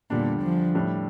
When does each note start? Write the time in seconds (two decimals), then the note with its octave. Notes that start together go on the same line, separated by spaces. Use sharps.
0.10 E2 A#2 D3 G3 D4
0.42 F3
0.75 A2 G3 D4